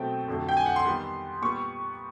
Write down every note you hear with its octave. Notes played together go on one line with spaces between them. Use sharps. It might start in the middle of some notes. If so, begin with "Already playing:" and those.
Already playing: B2 F#3 A3 C4 G5
F2 D3 F#3 A3
G5
G#5
F#5
C6
D#3 G3 B3
A#2 G3 B3 C#6